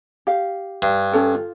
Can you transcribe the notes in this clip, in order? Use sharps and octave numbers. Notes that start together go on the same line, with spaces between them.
G4 F5
G2
C#4 A4 G5
F4